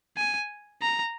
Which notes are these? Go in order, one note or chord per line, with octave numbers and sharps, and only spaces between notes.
G#5
A#5